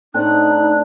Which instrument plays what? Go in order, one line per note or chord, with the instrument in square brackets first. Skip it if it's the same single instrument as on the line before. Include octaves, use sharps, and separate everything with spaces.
[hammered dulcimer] A2 C4 D4 [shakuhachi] D#4 [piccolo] F#6